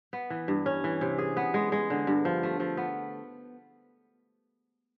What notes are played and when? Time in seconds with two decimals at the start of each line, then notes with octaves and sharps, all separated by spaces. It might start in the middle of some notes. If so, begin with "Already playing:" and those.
0.13 B3
0.30 E3
0.48 G2
0.66 C#4
0.84 E3
1.01 C3
1.18 G#4
1.37 B3
1.54 G#3
1.72 G#3
1.90 D3
2.07 G2
2.25 F3
2.43 A3
2.60 F3
2.77 B3